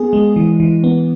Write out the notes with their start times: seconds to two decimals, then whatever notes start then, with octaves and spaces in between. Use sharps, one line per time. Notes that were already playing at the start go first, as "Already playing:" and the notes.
Already playing: B3 G#4
0.13 G#3
0.36 E3
0.60 E3
0.84 B3